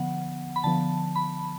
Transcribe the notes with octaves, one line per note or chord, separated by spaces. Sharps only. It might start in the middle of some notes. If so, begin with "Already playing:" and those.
Already playing: D3 F3 B3 F#5
B5
D3 F3 B3 A5
B5